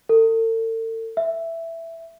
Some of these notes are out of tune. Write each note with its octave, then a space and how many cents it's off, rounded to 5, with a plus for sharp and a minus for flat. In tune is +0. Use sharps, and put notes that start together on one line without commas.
A4 +40
E5 +5